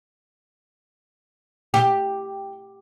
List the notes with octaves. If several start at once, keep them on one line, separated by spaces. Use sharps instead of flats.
G4